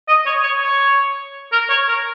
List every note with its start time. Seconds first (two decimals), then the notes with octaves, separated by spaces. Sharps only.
0.08 D#5
0.26 C#5
0.43 C#5
0.62 C#5
1.52 A#4
1.69 C#5
1.88 A#4